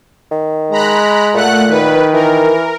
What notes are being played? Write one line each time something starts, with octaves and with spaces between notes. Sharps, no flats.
D#3
G#3 A#5 B5 F#6
A#2 A3 F#5 F#6
D#3 B4
E3 A#4